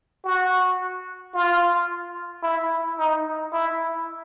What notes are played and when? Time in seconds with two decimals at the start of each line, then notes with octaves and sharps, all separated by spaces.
0.24 F#4
1.34 F4
2.43 E4
2.98 D#4
3.53 E4